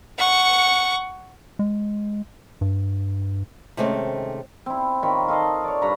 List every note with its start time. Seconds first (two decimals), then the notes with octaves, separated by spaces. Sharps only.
0.18 F#5 C#6
1.59 G#3
2.61 G2
3.77 C3 D#3 G#3 A3 C4 C#4
4.66 C4 E4
5.03 D#3 F4 C#5 B5
5.28 F4 A4 D#5 F5
5.64 C#5 D5
5.82 G2 C#5 A#5 B5